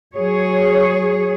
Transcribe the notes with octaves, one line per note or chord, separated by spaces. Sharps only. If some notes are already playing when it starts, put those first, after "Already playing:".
F#3 G#4 C#5